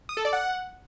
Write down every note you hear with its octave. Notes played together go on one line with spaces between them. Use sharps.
D#6
A4
D5
F#5